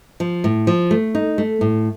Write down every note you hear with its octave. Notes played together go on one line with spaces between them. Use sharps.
F3
A2
F3
A3
D#4
A3
A2